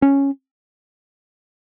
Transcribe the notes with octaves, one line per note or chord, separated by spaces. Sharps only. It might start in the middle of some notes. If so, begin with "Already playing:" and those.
C#4